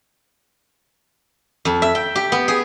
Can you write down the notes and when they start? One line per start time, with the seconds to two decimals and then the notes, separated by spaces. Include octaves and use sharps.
1.65 F2
1.82 E5
1.95 G5
2.15 G4
2.32 B3
2.48 G#4